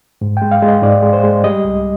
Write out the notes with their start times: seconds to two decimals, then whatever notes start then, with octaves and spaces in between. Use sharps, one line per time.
0.21 G#2
0.37 G#3 G5
0.51 F5
0.62 G#3
0.68 D#5
0.83 G#2 D5
1.02 G#3
1.13 C5
1.24 G#3
1.44 G3 D#5
1.65 C2